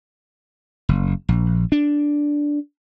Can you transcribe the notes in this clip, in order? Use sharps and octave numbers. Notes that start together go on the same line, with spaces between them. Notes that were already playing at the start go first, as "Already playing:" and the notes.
F#1
A#1
D4